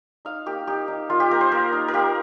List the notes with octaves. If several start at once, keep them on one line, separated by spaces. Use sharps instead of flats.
D#4 F5
A#3 G4
D#4 G4
D#4
A#3 F4
G4
A#3 A#4
C5
A#3 A#4
D#4
A#4
A#3 G4